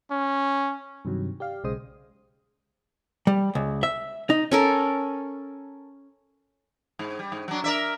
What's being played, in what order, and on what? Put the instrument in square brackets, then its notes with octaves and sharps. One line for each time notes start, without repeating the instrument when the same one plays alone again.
[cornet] C#4
[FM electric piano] G2 C3 D#3 F#3
G4 D5 F5
B1 C#3 G#3 C5 D#6
[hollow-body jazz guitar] G3
C#2
E5
D#4
[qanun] C#4 A4 A#4
[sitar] G#2
G3
G#2
F#3 D4
A#4 D5 E5